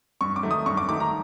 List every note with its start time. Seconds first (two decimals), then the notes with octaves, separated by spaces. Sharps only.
0.21 G2 C#6
0.36 D6
0.43 D#3 F#3 A3
0.51 D#6
0.66 G2 C#6
0.77 D6
0.89 D#3 F#3 A3 D6
1.00 A#5